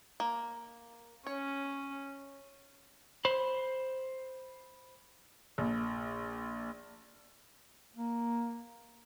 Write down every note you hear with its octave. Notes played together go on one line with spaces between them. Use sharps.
A#3
C#4 C#5
C5 B5
A#1
A#3